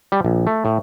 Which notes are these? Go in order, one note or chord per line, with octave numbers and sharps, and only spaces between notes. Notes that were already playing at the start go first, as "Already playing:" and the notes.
G3
A#1
A3
A2